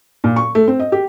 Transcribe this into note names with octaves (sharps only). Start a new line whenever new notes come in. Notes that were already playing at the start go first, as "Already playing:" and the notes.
A#2
C#6
A3
C4
D#5
G4